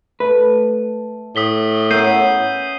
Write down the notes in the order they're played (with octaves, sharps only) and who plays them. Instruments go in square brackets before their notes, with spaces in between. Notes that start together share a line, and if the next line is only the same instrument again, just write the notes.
[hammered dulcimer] A3 [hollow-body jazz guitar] B4
[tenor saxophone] A2 [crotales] D#6 B6 G7
[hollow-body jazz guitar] A#3 [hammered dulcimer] B3 C#4 E5 [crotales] G6 C7 D#7